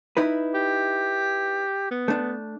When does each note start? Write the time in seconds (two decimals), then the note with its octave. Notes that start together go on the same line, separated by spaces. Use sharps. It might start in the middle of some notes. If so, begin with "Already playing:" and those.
0.17 D#4 E4 B4
0.54 G4
1.91 B3
2.08 A3 D4